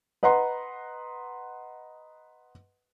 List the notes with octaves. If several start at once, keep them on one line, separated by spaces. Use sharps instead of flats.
B4 D#5 F#5 A#5 C6